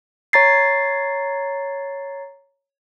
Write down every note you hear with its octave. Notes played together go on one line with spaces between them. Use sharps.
C#5 A#5 A6 C7